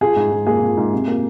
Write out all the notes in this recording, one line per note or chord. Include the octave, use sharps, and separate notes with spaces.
F3 G#4
G#2
G#2
A#3 G#4
F3
G#2
C3
A#3